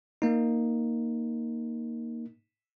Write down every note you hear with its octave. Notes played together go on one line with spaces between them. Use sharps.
A#3 D#4